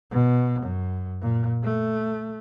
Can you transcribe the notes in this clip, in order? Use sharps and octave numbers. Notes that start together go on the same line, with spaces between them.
B2
F#2
A#2
A3